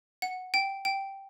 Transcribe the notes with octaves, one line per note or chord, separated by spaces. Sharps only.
F#5
G5
G5